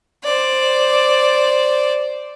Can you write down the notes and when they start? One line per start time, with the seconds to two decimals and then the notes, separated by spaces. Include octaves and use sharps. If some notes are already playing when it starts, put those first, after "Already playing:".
0.24 C5 D5